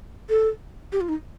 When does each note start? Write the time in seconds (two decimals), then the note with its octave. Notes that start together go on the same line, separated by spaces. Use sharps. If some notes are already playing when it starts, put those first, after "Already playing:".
0.29 A4
0.92 G4
1.01 F4
1.09 D#4